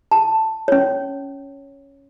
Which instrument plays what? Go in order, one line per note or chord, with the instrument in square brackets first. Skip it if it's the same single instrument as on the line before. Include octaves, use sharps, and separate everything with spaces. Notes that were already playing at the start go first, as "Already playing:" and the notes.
[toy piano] A5
C#4 C#5